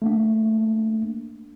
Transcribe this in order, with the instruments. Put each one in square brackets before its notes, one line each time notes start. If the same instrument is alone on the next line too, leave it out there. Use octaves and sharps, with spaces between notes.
[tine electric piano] A3 A#3 D4